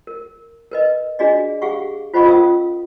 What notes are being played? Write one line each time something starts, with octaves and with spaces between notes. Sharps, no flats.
A#4
A#4 B4 D#5
D4 F#4 G#4 D5 D#5
G4 G#4 F5 F#5 C#6
F4 C5 D#5 F#5 B5 C#6
C#4 F4 A4 A#4 F5 D#6